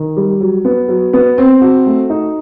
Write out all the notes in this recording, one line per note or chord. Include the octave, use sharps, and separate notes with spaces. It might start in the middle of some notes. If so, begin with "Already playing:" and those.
Already playing: D#3
G3
F#3
B3
F#3
B3
C4
F#4
A3
D#4